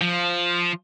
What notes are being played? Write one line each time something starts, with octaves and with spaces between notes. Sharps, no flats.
F3